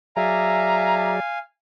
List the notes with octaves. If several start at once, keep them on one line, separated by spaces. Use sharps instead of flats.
F#3 G#4 D5 E5 F5 G#5 A#5